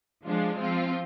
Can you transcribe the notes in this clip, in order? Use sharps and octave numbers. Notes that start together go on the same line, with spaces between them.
F3 G#3 D4 F4
F3 C4 F4